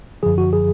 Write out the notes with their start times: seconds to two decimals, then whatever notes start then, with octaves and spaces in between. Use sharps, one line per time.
0.23 F#2 D3 F3 G#4
0.38 F#4
0.53 G#4